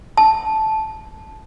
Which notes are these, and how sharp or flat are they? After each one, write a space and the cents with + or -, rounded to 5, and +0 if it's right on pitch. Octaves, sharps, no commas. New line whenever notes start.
A5 -10